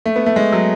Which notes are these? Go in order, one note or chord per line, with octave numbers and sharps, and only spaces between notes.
A3
B3
A3
G#3
F#3